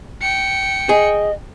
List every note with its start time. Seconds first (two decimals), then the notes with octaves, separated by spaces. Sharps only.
0.22 G5 C#7
0.89 G#4 D#5